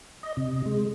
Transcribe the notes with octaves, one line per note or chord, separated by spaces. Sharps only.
D#5
C3
G#3